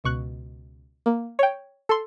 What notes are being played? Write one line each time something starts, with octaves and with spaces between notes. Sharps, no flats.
C#2 B2 C#6 F#6
A#3
C#5 G5
A4 C6